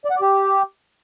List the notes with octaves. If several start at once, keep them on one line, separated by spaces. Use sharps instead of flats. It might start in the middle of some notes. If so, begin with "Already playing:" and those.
D5
F#5
D5
G4